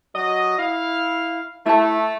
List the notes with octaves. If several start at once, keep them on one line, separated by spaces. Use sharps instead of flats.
F#3 D#5
E4 F5
A3 E4 A5